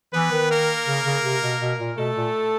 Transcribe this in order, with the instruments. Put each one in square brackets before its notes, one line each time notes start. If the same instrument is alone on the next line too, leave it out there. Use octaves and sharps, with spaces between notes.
[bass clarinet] E3 [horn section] B3 B4
[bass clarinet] D#3
[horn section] A#3 A#4
[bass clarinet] C#3
C#3
C3
B2
B2
A#2
[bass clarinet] B2 [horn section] A3 A4
[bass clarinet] A#2